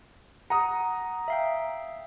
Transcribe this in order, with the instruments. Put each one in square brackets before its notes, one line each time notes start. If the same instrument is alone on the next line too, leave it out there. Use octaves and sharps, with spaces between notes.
[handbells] F#5 [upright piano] A#5 D#6
[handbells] E5 F5 G5